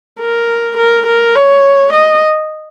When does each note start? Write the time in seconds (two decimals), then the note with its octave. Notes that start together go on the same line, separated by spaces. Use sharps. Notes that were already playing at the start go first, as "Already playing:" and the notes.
0.20 A#4
0.77 A#4
1.06 A#4
1.36 C#5
1.93 D#5